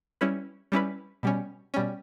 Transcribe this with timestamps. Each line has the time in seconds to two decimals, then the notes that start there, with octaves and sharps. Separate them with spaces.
0.21 G3 C#4 E4 B4
0.72 G3 C#4 E4 B4
1.23 B2 G3 C#4
1.74 B2 G3 C#4